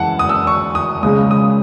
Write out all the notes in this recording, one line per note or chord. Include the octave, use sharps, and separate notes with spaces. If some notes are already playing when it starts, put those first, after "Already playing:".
Already playing: F#2 E3 G#3 F#5 A5
D#6
E6
C#6
D#6
C#2 C#3 G#3 D#6
D#6